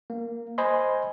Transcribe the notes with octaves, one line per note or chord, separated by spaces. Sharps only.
A#3
C5 D#5 G#5 B5 C6